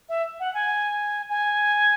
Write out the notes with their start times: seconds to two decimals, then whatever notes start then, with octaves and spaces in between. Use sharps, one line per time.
0.09 E5
0.40 F#5
0.54 G#5
1.29 G#5